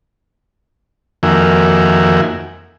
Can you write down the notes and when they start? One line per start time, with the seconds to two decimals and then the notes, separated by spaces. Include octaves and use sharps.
1.23 F2 D#3 A#3 F#4 E5 G#5